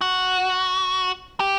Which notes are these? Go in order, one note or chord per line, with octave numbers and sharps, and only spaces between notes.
F#4
G4